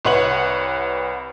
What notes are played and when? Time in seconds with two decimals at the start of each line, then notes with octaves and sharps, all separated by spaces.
0.05 C2 B4 C#5 F#5 F#7